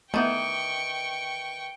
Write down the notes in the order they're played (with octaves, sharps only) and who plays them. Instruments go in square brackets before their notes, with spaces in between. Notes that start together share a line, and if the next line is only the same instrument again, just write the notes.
[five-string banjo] D#3 E3 [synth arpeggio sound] A3 B3 [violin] G5 C#6